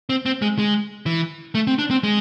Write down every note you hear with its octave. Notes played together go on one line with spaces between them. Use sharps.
C4
C4
G#3
G#3
E3
A3
C4
D4
C4
G#3